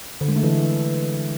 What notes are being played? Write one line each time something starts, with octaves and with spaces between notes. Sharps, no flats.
D3
G#3
A3
E3